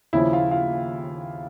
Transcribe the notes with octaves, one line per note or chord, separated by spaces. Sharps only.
D#2 C#3 F3 E4
F4
F4